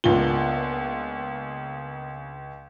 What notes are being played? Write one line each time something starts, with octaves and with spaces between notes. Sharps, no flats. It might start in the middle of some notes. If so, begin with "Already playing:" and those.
C#2 A#3 B3 D4 F4 G7